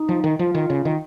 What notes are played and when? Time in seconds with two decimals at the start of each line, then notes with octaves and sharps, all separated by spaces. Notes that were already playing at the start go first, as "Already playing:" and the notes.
Already playing: D#4
0.09 F3
0.24 D#3
0.39 F3 F4
0.55 D#3
0.70 C#3
0.85 D#3